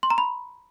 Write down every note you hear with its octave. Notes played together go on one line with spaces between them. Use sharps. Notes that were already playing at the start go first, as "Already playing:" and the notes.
C6
A#5
B5